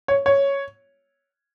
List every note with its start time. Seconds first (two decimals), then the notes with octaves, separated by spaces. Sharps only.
0.08 C#5
0.26 C#5